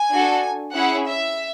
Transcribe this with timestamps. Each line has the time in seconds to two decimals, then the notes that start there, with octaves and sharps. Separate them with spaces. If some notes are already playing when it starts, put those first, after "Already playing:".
Already playing: G#5
0.11 D4 F#4 A4
0.73 C#4 E4 G#4 F#5
1.06 E5